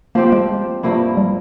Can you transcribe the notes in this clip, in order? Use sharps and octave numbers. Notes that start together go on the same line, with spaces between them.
F3 A#3 C4 G4
G#3
G2 F3 A#3 E4
G3